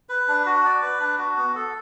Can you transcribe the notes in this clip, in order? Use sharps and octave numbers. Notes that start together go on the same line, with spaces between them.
B4
D4
F#4
D5
B4
D4
F#4
B3
A4